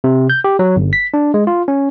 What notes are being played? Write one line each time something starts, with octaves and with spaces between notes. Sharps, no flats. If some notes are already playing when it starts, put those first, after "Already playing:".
C3
G6
G4
F#3
G1
B6
D4
G#3
F4
C#4